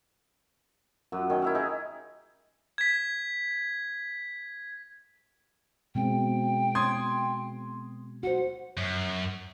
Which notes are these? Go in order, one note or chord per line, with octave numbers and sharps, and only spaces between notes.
F#2 F#3
D#3 C#4 G5
E4 E5 F5
D#4 G#4
G#6 B6
B2 G#3 C4 G5
C6 D#6 G#6
F#4 C5 F#5
F#2